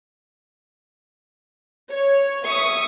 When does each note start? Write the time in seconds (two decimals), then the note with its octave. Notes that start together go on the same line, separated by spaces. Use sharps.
1.91 C#5
2.45 E5 C#6 D#6